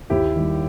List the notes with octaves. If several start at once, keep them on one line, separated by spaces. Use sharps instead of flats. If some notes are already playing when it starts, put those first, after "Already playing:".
D#2 E4 G4
D#3 G3